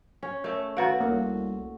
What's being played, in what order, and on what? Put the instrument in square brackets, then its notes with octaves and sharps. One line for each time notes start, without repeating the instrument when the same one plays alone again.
[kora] C#4
[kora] A3 [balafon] A#4 C#5
[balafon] D#3 B4 F5 [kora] F#4 F#5
[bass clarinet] C2 [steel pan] A#3